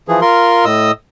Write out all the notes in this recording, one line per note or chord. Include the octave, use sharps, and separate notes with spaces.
E3 F3 G#4
F4 A#4 C6
A2 D#5 D#6 E6